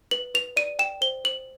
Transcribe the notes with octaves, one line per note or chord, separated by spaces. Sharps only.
B4 F#7
B4 F7
D5 D#7
G5 E7
C5 G7
C5 F#7